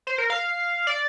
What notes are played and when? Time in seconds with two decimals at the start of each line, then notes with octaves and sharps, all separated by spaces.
0.07 C5
0.18 A#4
0.30 F5
0.87 D5